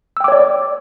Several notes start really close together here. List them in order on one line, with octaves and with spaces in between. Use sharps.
E6 G5 D6 C#5 D5